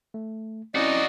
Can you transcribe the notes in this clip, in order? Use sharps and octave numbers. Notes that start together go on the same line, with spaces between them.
A3
C4 C#4 D#4 E4 F#4 D5 D#5